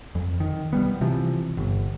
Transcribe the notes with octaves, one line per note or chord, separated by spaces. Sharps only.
F2
D#3
C2 G3 B3
C3 E3 F3
G1